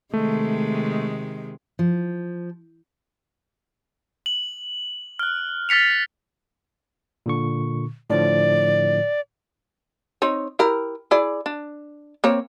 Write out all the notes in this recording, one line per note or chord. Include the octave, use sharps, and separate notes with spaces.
C3 D#3 G#3 A3
F3
F#7
F6 F#6
F6 A6 B6 C#7 F7
A#2 D3 C#6
A2 D3 F3 D5
C4 D#4 C#5
E4 G4 A#4
E4 G#4 D5
D4
A#3 C4 C#5